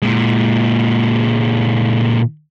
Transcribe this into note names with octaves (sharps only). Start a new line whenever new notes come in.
A#2 G#3